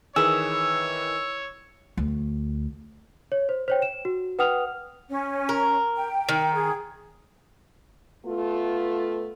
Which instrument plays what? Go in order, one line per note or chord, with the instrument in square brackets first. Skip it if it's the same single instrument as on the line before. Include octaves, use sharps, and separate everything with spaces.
[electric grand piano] D#3 E3 B4 [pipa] G#4 [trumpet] C#5 [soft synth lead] E6
[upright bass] D2
[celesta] C#5
C5
C5 C#5 G5
E7
F#4
B4 F#5 G5 D#6 F6 F7
[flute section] C#4
[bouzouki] A#4
[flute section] G5
[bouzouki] D#3
[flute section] G#4
[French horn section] A3 B3 F4